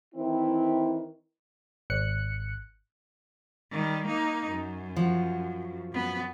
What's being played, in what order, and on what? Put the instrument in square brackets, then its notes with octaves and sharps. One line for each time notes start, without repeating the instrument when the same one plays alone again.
[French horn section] D#3 E3 C4 E4
[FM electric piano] G#1 F#6 C#7
[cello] D#3 G3
A#3 D#4
F#2
[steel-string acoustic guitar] F3 F#4
[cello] F#2 B3